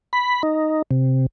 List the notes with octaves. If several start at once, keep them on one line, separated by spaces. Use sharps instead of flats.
B5
D#4
C3